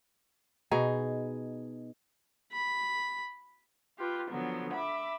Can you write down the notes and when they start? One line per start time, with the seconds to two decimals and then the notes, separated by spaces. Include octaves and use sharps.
0.71 B2 D#4 G#4
2.52 B5
3.96 F4 G4 B4
4.30 D3 F3 F#3 B3
4.72 E5 B5 D6